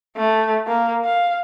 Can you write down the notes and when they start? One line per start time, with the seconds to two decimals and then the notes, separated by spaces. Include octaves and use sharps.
0.17 A3
0.68 A#3
1.05 F5